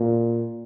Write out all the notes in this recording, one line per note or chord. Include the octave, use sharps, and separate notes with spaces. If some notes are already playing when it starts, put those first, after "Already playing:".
Already playing: A#2